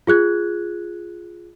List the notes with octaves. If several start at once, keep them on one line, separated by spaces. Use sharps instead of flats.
F4 G#4 F#6 G#6